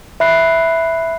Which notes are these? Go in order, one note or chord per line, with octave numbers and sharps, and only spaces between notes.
E5 B5 F#6 C7